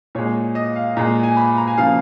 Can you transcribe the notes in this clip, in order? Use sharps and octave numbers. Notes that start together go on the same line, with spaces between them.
A#2 G#3 C#5
D#5
F5
A#2 G#3 A#5
G#5
B5
A#5
G#5
C#3 F3 A#3 F5